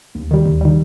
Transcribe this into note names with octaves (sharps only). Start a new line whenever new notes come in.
D#2
D#3 G3
D#2
D#3 G3